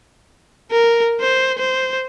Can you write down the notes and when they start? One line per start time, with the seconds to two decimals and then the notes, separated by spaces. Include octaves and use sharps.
0.71 A#4
1.20 C5
1.59 C5